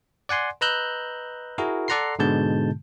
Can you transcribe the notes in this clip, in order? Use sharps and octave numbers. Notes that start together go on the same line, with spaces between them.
D5 F#5 G#5 C6
B4 D#5 A#5 E6 F#6 G6
E4 F#4 G#4 A#4
A4 D5 F#5 A#5 C6 C7
G#2 B2 D3 G#3 A5 G6